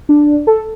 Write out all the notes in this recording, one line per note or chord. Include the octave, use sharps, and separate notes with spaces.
D4
A4